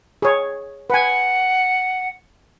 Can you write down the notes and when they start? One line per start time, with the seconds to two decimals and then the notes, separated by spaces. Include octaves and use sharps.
0.22 G#4 C#5
0.90 B4 F#5 G#5